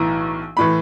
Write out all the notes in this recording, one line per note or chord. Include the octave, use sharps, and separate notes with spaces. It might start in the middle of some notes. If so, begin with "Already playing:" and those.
Already playing: B1 A2 E3 A#5
A2 E3 B5